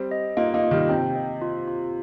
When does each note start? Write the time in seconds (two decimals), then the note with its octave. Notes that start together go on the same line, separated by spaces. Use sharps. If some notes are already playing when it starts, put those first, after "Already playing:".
Already playing: G3 C4
0.11 D#5
0.37 A#3 D#4 F4
0.54 A#3 D#4
0.64 F4
0.71 D#3 G3
0.89 C3 G5
1.16 D#5
1.42 F4
1.68 F4